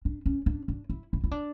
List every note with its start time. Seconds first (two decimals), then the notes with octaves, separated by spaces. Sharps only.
0.05 D4
0.26 C#4
0.46 D4
0.68 D4
0.90 E4
1.13 E4
1.24 E4
1.31 D4